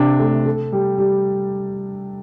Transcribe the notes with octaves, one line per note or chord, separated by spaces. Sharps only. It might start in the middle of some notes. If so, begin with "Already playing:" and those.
Already playing: C3 D4
A3
A4
G3
G3